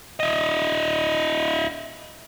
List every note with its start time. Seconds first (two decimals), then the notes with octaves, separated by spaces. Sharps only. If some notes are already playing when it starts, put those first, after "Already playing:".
0.20 E4 D#5